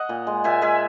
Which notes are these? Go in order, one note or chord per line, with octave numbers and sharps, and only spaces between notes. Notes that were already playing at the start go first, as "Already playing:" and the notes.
Already playing: D#5 F#5
A#2
G#3
A#2 E5 G#5
G#3 E5 G#5